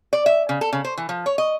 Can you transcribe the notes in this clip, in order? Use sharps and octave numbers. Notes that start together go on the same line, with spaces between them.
D5
E5
C#3
A4
C#3
C5
E3
F3
C#5
D#5